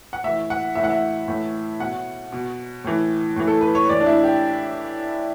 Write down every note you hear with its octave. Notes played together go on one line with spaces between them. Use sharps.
F#5
A2 E3 E5
F#5
A2 E3 E5
F#5
E5
A2 E3
B2 F#5
B2
A2 E3
A2 E3
A4
B4
C#5
A2 E3 D5
D4
E4
G4